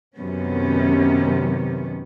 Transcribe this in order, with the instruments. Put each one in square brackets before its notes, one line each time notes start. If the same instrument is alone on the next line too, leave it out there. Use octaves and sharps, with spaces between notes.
[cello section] F#2 C3 D#3 B3 C#4